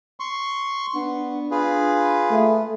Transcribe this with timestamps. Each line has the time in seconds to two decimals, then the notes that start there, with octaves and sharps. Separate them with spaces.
0.20 C6 C#6
0.95 B3 D4
1.51 F4 G#4 B4
2.31 A3